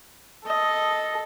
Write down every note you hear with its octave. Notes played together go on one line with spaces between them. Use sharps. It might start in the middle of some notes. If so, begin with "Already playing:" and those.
A4 D#5